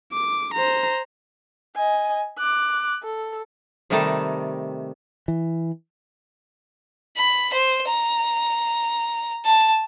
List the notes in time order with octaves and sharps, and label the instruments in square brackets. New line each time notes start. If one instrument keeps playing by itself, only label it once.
[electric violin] D6
C5 A#5
[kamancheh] D#5 G#5
D6 F#6
A4
[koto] C3 D#3 G3 A3 D#4 A5
[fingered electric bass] E3
[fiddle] B5
C5
A#5
A5